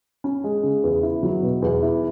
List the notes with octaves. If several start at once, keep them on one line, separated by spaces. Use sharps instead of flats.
C#4
G#3
C#3
E2
E4
F#3
B2
E2
E4